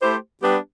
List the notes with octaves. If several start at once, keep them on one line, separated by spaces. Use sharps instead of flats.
A3 E4 G4 C5
G3 B3 D4 G4 B4